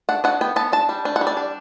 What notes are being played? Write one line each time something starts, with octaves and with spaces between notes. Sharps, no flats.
D4 F#5
D4 F#5
B3 G5
B3 A5
D4 A5
G3
D4
F#5
G3
D5
D4